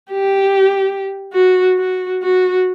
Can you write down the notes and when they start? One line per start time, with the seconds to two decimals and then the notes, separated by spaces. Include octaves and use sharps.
0.12 G4
1.33 F#4
1.78 F#4
2.22 F#4